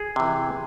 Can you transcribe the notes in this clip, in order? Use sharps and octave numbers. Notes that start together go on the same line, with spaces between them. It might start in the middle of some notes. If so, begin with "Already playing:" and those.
Already playing: G#4
C3 E3